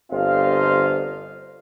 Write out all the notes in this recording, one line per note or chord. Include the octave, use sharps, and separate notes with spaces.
G1 C4 F4 C5 D#5 F5